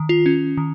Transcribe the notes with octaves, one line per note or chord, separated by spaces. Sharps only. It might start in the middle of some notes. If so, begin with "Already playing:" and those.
Already playing: D#3
F4
C#4
D#3